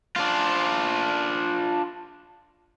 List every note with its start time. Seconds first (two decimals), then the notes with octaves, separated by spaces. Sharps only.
0.16 D4 F4